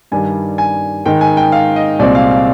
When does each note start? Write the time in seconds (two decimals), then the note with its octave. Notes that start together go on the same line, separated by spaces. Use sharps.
0.12 G2 D#3 G3 G#5
0.58 G#5
1.06 G#2 D#3 G#3 G5
1.21 G#5
1.37 G5
1.52 F5
1.76 D#5
1.99 C2 A#2 G#3 C4 D5
2.15 F5
2.31 F5